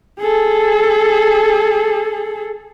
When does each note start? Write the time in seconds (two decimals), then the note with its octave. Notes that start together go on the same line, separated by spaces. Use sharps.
0.20 G#4 A4